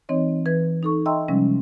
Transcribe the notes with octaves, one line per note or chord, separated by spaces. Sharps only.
E3 C4 D#4 C#5 D#5
E3 B4 G#6
D#4 A4 C#6
D#5 E5 G5 A#5 C6 E6
C3 F3 G3 G#3 C#4